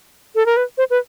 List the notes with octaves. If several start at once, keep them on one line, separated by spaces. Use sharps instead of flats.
A4
A#4
B4
C5
B4